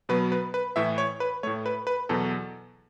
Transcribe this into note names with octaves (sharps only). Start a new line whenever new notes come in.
B2 F#3 B3 B4
B4
B4
A2 E3 A3 E5
C#5
B4
A2 A3 C#5
B4
B4
E2 B2 F#3 A4